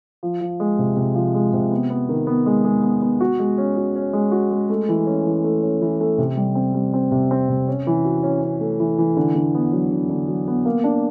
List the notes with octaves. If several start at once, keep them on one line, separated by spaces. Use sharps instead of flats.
F3
F3
G#3
C3
C3
F3
G#3
C3
B3
B3
D#3
B3
G#3
G#3
B3
B3
F#4
G#3
C#4
F#4
C#4
G#3
F#4
G#3
A3
E3
C#4
E3
A3
C#4
E3
A3
C3
G3
C4
G3
C4
C3
C4
C3
C#4
E3
F#4
C#4
C#4
A3
E3
E3
D3
D3
B3
F#3
D3
D3
F#3
B3
A#3
D4